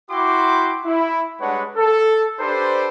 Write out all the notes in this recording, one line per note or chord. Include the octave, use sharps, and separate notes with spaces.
E4 F#4 G5 C6 D6
E4
G3 G#3 D4 B4 C#5 F#5
A4
D4 G4 A4 B4 C5